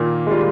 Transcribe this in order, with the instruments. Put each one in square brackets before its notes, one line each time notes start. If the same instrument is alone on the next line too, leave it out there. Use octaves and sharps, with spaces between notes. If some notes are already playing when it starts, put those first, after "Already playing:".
Already playing: [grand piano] A#2 A#3 [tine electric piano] D#3
[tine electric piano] G#3
[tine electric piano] G3 [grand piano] F4